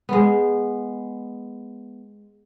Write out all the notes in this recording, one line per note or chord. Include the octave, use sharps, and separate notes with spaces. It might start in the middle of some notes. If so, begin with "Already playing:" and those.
G#3 B3